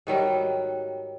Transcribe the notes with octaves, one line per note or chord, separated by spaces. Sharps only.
G#2 D#3 F#3 G3